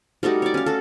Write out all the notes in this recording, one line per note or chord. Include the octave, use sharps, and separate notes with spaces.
G3 A3 D#4 F#4
C#5 D5
C#4 F5
F#4 A4